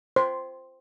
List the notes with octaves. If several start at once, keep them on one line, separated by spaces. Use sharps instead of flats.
C5